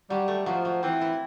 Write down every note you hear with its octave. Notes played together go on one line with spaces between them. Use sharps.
F#3 G3
A3
F3 F#3
F#3
E3 C4
E4